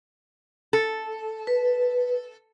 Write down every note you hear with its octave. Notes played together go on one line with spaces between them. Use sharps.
A4
B4